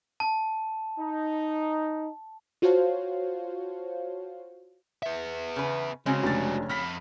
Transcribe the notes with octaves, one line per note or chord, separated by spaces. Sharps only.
A5
D#4
F4 F#4 C5 C#5 F5 A5
B3 E5
C#3 B4
C#3 G#3 C4 C#4 F#4
F1 D4 A6
F2 B5 F6 B6